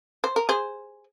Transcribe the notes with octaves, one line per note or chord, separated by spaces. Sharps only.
C5
A#4
G#4 C5